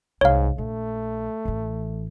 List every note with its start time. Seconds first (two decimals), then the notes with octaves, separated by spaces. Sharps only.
0.21 C2 G#2 C#5 F5
0.58 A#1 A3
1.45 A1 E3